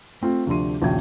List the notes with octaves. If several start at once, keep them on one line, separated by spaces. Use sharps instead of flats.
A3 C4 F4
D2 C3 F3 D4 C6 D#7
A#1 D#2 C#3 F#4 G5 G#6